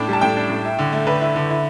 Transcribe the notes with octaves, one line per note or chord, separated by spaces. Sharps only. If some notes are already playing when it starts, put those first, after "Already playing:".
Already playing: A2 D4 G5
G3 A5
A2 G5
D4
A2
E4
D3
A3
D3 B4
E4
D3
E4